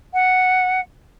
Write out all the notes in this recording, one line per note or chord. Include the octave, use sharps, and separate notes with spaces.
F#5